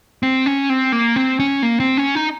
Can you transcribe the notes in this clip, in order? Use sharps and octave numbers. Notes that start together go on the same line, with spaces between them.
C4
C#4
C4
A#3
C4
C#4
A#3
C4
C#4
D#4